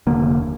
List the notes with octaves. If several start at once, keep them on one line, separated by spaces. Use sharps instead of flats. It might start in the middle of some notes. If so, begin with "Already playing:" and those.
F1 D#2 D3 A#3